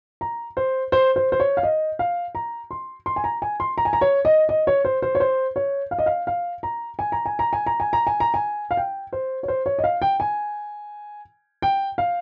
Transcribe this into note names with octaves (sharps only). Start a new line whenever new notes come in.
A#5
C5
C5
C5
C5
C#5
F5
D#5
F5
A#5
C6
C6
G#5
A#5
G#5
C6
A#5
G#5
A#5
C#5
D#5
D#5
C#5
C5
C5
C#5
C5
C#5
F5
D#5
F5
F5
A#5
G#5
A#5
G#5
A#5
G#5
A#5
G#5
A#5
G#5
A#5
G#5
F5
G5
C5
C#5
C5
C#5
D#5
F5
G5
G#5
G5
F5